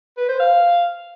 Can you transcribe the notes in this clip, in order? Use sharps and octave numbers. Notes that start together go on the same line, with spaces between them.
B4
C5
F5